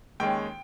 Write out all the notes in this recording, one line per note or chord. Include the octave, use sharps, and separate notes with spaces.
D#2 D#3 G#3 C#4 G5